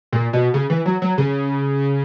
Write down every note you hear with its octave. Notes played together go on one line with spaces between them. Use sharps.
A#2
B2
C#3
E3
F#3
F#3
C#3